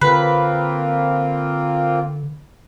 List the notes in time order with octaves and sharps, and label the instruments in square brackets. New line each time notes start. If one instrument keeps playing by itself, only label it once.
[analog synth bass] D3 [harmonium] A#3 C4 F4 [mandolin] B4